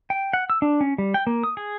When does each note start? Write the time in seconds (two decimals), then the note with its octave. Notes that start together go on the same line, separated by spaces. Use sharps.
0.10 G5
0.33 F#5
0.50 E6
0.62 D4
0.81 C#4
0.98 G3
1.14 G5
1.27 A#3
1.44 D#6
1.57 G#4